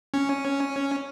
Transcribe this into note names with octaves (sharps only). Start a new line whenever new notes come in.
C#4